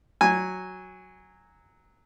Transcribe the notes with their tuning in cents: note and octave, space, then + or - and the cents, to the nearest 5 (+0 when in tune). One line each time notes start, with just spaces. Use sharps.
F#3 +0 G#5 -10